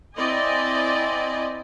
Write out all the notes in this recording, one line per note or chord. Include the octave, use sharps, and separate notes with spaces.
C4 E4 D5 D#5 G#5